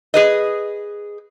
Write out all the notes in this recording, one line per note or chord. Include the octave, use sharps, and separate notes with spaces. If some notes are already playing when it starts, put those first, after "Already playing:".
G#4 B4 D#5